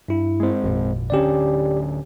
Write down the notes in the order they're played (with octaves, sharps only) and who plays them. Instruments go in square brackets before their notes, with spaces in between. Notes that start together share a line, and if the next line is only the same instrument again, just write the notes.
[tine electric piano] G2 E4
[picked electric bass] G#3 C4
[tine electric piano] G#1 F2 A#2
[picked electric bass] D1 D3 C#4 [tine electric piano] G4 D5